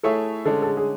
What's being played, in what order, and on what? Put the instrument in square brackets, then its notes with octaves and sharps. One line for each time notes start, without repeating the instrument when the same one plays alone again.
[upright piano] A3 E4 G#4 C#5 E5 [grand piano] A4
[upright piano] D3 G#3 C#4 [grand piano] A4
[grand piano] A4
G#4
G#4